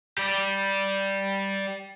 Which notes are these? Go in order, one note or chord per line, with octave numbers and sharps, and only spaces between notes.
G4 D5